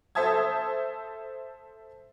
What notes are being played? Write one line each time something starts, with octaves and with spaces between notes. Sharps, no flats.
A4 C5 E5 A5 D#6 G#6